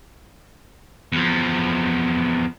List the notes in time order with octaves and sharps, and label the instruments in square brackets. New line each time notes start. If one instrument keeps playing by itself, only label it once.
[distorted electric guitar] E2 F3